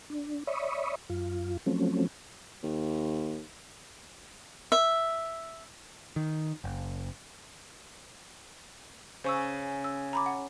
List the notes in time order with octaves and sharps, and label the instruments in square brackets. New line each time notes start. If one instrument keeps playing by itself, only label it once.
[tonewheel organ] D4
C#5 D5 E5 B5 C#6 D#6
F#2 F4
F3 F#3 A3 C4 C#4
[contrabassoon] D#2
[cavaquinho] E5
[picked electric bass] D#3
F#1
[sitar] C#3 [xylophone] C5 C#6 E6
[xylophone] E6
A#5 B5 D6
F#5